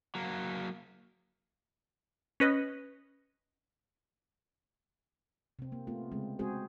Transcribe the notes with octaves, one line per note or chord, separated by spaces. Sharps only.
F#3 A#3
C#4 B4 D#5
C3 C4
A#3
A3 B3 F4
C#3 G#3 C4
G#3 C4 F#4 G#4 C5